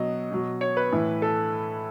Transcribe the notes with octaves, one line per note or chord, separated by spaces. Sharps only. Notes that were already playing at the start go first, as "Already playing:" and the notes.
Already playing: B2 F#3 D#5
B2 F#3
C#5
B4
A2 E3
A4